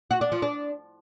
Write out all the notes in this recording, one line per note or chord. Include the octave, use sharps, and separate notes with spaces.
F#4
D4
F3
D4